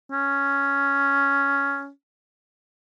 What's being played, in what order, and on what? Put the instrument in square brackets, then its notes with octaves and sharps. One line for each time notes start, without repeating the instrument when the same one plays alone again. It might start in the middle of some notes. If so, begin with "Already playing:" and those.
[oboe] C#4